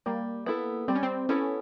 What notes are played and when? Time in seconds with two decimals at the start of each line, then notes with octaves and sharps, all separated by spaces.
0.06 G3 A#3
0.46 B3 E4 A4
0.88 G3 C4
0.95 C#4
1.03 C4
1.29 B3 C#4 E4 A4